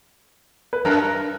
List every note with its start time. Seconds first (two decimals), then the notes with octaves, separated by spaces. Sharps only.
0.73 B4
0.85 F#2 A#4